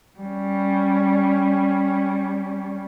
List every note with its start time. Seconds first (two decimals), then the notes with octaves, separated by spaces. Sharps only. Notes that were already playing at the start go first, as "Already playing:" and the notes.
0.19 G3 C#4